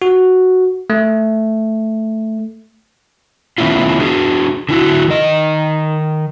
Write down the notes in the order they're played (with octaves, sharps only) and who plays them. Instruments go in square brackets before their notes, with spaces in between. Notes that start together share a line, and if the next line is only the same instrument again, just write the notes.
[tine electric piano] F#4
A3
[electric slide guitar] D#3 A3 B3 C#4 E4 F4
D4 F#4 G#4
D3 E4 F#4
D#3 D#5